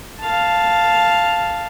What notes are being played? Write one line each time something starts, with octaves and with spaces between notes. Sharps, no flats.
F5 A5